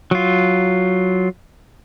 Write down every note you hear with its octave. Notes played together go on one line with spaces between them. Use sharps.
F#3 F4